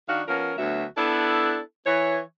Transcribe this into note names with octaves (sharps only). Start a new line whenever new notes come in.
D#3 D4 F#4 F5
F3 B3 C#4 A#4
D2 F#3 B3 F#4 E5
B3 D4 E4 A4
E3 C#5